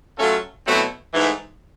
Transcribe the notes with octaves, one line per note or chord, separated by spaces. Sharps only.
F#3 A3 C#4 F4 A4
B2 F#3 A3 C4 E4
G#2 E3 A3